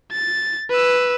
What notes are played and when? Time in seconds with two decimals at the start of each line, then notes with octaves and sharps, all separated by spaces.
0.12 A6
0.70 B4 E6